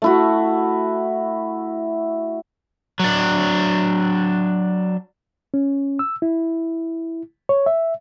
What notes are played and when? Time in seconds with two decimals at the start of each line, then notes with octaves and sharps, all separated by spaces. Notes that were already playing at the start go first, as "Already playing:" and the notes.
0.02 A3 E4 F#4
3.00 F#3 D4
5.54 C#4
5.99 E6
6.22 E4
7.49 C#5
7.66 E5